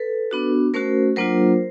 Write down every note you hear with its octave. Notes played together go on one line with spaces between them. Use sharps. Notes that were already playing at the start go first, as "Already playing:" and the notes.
Already playing: A4 B4
B3 D4 F#4
A3 C#4 F#4 A#4 C5
F#3 A#3 D4 F4 A#4 C5